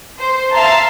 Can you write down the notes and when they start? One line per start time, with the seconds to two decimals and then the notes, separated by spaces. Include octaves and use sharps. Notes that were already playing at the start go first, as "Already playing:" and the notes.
0.17 C5
0.53 E5 F5 A5 A#5 C6